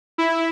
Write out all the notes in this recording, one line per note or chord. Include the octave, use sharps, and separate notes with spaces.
E4